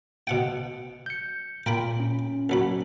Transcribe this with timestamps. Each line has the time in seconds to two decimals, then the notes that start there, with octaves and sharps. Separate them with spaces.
0.27 B2 F#5 G5
1.06 G6 C#7
1.66 A#2 A#4 G5 B5
2.00 C#4
2.50 A#1 F#3 B5